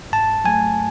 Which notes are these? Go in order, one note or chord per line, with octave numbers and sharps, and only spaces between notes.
G#2 A5
F#3 A3 G#5